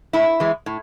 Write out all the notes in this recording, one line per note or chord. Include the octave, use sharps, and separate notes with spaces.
A2 E4
E3 G#3
A2